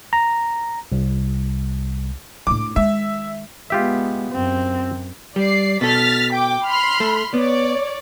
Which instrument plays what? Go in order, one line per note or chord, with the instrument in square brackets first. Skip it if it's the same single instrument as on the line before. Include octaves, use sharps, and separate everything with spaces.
[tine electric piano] A#5
C2
[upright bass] A2 D4 [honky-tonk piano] D6
[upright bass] D#3 G#3 [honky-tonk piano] E5
[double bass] G#3 B3 [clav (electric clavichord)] F4 G4 E5
[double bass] F#2 [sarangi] C4
[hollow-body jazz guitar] G3 [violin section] D5 C7
[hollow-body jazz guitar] B2 A4 [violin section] F6 A6 B6
[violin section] G5 D6
B5 C6 F6
[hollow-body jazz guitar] A3
[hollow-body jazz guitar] B3 [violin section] C#5 D5